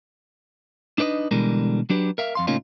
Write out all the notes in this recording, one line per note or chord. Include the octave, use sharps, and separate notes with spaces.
D4 D#4 B4 D5 D#5
B2 D3 E3 G3 G#3 A#4
F#3 D4 G4 B4
A#4 E5 F5
F2 F5 C6
A2 C#3 A#3 C#4 D#4 F4